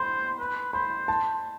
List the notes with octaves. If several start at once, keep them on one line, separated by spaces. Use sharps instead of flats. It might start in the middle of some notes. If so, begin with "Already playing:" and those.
Already playing: C5 B5 C6
B4
C5 B5
A5